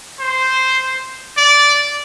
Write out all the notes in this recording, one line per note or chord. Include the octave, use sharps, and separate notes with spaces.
C5
D5